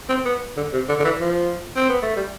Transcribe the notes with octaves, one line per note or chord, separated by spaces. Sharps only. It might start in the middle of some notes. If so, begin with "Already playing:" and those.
C4
B3
D3
C3
D3
D3
E3
F3
C4
B3
A3
G3